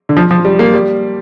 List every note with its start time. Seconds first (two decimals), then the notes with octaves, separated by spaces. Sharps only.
0.09 D3
0.16 F3
0.31 F3
0.45 G3
0.59 A#3
0.74 G3